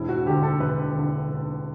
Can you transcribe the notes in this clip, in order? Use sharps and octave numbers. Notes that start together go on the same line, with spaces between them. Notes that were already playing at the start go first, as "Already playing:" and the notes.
Already playing: E1 E4
F#4
D2 D3 G4
A4
E1 B4
D2 D3
E1